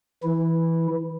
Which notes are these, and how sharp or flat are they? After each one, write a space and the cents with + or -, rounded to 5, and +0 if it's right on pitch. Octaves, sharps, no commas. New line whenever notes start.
E3 +0 E4 -10